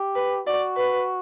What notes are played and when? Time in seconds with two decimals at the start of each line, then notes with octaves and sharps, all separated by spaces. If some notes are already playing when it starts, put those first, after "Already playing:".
Already playing: G4
0.15 B4
0.47 F#4 D5
0.77 B4